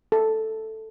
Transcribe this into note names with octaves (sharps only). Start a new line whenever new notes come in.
A4